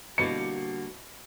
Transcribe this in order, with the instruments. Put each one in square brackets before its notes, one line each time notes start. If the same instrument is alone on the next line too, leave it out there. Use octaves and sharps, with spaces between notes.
[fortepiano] B2 E3 [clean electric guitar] D3 G3 A#3 [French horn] F#4 [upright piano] C#7